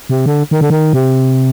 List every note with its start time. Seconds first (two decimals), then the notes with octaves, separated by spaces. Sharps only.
0.09 C3
0.26 D3
0.51 D#3
0.61 D3
0.70 D#3
0.93 C3